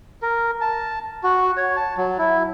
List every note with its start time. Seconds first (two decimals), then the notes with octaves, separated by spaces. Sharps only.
0.22 A#4
0.61 A5
1.23 F#4
1.57 C#5
1.77 A5
1.98 F#3
2.18 E4